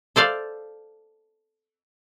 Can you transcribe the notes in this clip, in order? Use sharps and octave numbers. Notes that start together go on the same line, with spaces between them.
A4 C5 D5 F5